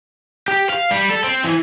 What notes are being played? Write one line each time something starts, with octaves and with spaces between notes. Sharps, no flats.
G4
F5
G3
A4
C4
E3